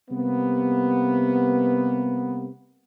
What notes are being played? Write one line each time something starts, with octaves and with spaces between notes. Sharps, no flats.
C3 G3 A#3 B3